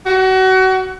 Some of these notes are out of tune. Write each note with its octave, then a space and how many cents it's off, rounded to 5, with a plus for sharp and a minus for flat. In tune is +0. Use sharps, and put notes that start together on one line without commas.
F#4 +30